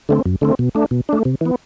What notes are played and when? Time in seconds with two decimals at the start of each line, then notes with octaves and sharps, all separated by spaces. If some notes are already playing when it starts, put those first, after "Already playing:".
0.09 D3 A3 C4
0.26 F#2
0.41 D3 A3 C4
0.59 B2
0.75 A3 D4
0.91 B2
1.09 A3 D4
1.25 C3
1.41 E3 B3